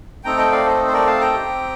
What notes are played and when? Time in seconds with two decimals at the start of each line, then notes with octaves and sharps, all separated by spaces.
0.24 A3 C4 D#4 A4 G5 A#5
0.38 D#5 G5
0.52 D5 F5
0.66 C5 D#5
0.88 C5
0.93 A#4 D5
1.07 F5 A5
1.20 G5 A#5
1.34 C4 G4